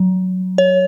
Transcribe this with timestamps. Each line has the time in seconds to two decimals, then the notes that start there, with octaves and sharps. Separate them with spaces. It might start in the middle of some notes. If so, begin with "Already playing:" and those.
Already playing: F#3
0.58 C#5